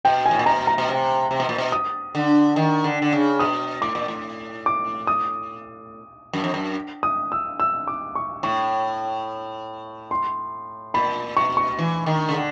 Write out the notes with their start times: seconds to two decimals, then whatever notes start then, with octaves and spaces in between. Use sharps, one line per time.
0.05 B2 G5
0.26 G#5
0.31 A2
0.39 A#2
0.46 B2 A#5
0.67 A#5
0.78 B2
0.89 C3
1.31 C3
1.40 B2
1.49 A#2
1.58 B2
1.72 D#6
2.15 D3
2.56 D#3
2.84 D3
3.02 D3
3.13 C#3
3.39 B2 D#6
3.82 A2 D6
3.95 A#2
4.08 A2
4.66 D6
5.07 D#6
6.33 F#2
6.44 F2
6.54 F#2
7.03 D#6
7.32 E6
7.60 E6
7.88 D6
8.16 C#6
8.43 A2 C#6
10.11 C6
10.94 A#2 B5
11.37 B2 C#6
11.57 C#6
11.79 E3
12.06 D#3
12.29 C#3
12.34 D3